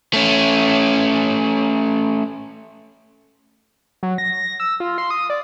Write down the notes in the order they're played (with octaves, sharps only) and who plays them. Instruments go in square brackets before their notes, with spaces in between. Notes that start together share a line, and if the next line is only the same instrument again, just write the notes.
[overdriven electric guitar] A3 C#4
[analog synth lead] F#3
A#6
A#6
E6
F4
C6
D#6
D5